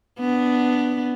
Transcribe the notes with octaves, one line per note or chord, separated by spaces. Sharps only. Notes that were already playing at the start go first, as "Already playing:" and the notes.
B3 D4